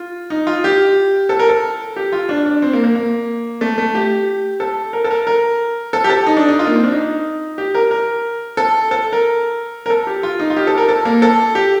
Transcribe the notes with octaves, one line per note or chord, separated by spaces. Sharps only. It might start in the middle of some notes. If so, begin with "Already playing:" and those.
Already playing: F4
D#4
F4
G4
A4
A#4
A4
G4
F4
D4
D4
C4
A#3
A#3
A#3
A3
A3
G4
A4
A#4
A4
A#4
A#4
A4
G4
A4
D#4
D4
D#4
F4
A#3
C4
D4
D#4
G4
A#4
A#4
A4
A4
A#4
A#4
A4
G4
F4
D#4
F4
G4
A4
A#4
A4
A#3
A4
G4